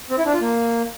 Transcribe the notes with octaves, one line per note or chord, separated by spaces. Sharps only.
C4
E4
D4
F4
A#3